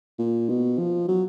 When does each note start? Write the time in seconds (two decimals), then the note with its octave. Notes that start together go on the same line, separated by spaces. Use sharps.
0.19 A#2
0.49 B2
0.78 F3
1.08 F#3